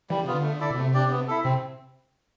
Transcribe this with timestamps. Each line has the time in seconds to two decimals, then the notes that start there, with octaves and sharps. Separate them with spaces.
0.10 E3 G3
0.17 D3
0.24 C3
0.27 D3 B3 F4
0.43 A3
0.60 E4 A4 D5
0.70 B2
0.77 C3 A3
0.94 D4 G4 D5
1.10 B3
1.28 E4 A4
1.44 C3 C4